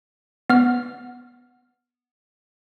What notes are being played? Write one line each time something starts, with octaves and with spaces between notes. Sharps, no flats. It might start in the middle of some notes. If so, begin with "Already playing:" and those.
B3 F6